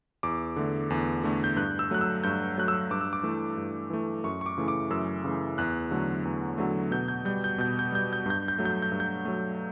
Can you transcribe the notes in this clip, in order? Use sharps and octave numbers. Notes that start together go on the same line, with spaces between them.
E2 D6
D3 A3
E2
D3 A3
G6
G2 F#6
E6
F#3 A3 F#6
E6
G2 G6
F#3 A3 F#6
E6
G2 D6
E6
D6
E3 A3
G2
E3 A3
F#2 C#6
C#6
D6
C#3 E3 A3
D6
F#2 E6
C#3 E3 A3
E2 F#6
D3 F#3 A3
E2
D3 F#3 A3
B2 G6
G6
G3 G6
G6
B2 G6
G6
G3 G6
G6
G2 G6
G6
F#3 A3
G6
G6
G2
G6
F#3 A3